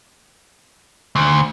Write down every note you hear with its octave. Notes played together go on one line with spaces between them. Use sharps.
D2